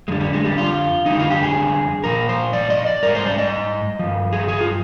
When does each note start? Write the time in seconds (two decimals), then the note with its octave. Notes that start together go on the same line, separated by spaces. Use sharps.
0.08 F2 D3 G3 G#3
0.20 G3
0.33 G#3
0.45 G3
0.58 F4
1.06 F2 D3 G3 D#4
1.19 F4
1.30 G4
1.43 G#4
2.04 A#2 F3 A#4
2.29 C5
2.53 D5
2.70 D#5
2.86 D5
3.03 G#2 G3 A#4
3.15 C5
3.26 D5
3.38 D#5
3.99 G2 F3
4.33 G#4
4.48 G#4
4.61 F4